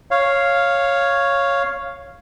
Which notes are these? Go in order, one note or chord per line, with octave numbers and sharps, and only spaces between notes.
C#5 F5